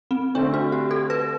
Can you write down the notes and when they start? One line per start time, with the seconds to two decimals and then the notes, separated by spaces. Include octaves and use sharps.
0.11 C4
0.35 D3 A3 C4 D4
0.54 F#4
0.72 G4
0.91 A4
1.10 B4